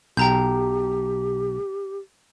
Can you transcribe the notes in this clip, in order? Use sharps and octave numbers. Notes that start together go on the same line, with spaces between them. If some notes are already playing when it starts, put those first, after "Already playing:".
B1 G4 G5 A#5 G6